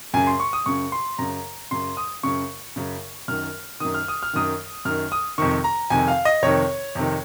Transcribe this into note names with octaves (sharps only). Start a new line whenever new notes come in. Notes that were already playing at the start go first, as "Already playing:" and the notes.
F#2 C#3 G#5
C6
C#6
D#6
F#2 C#3 C#6
C6
F#2 C#3 A#5
F#2 C#3 C6
D#6
F#2 C#3 C#6
F#2 C#3
F#2 D#3 F6
F#2 D#3 D#6
F6
D#6
F6
F#2 D#3 D#6
F#2 D#3 F6
D#6
F2 C3 D#3 C#6
A#5
F2 C3 D#3 G#5
F5
D#5
F2 C3 D#3 C#5
F2 C3 D#3